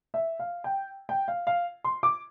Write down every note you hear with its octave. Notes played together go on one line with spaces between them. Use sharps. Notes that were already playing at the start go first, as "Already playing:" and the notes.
E5
F5
G5
G5
F5
F5
C6
D6